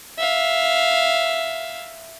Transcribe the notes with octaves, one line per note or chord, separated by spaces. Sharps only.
E5 F5